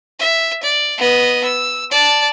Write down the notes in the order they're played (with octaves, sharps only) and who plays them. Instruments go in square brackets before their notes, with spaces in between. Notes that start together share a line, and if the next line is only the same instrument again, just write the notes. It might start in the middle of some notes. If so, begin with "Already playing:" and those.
[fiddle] E5
D5
B3 D#5
E6
D5 A5